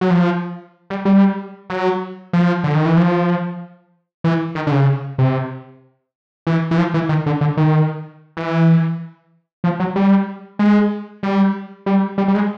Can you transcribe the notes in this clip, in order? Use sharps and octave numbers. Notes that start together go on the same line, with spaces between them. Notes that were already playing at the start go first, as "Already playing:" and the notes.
F#3
F3
G3
G3
F#3
F3
D3
D#3
E3
F3
E3
D#3
D3
C#3
C3
E3
E3
F3
E3
D#3
D3
D3
D#3
E3
F3
F#3
G3
G#3
G3
G3
G3
G3
G#3